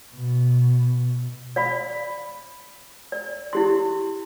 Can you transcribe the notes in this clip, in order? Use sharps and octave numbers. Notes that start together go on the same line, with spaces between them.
B2
D5 F5 B5
D5
E4 G4 C6